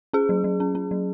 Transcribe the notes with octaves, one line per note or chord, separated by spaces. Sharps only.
C#4 G#4
F#3
F#3
C#4
C#4
F#3